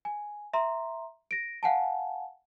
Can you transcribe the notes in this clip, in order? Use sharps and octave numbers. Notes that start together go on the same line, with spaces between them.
G#5
E5 A#5 C6
A#6 D7
F5 F#5 G#5 A5